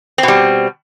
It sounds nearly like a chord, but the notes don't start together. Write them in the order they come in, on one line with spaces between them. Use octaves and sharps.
C4 B2 G3